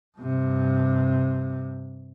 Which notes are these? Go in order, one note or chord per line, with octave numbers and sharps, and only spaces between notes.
G2 C3